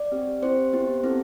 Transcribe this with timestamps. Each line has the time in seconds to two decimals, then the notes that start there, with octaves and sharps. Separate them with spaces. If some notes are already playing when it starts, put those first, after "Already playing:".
Already playing: D5
0.12 C4 G4
0.42 C4 E4 G4 C5
0.73 B3 E4 G4
1.04 C4 E4 A4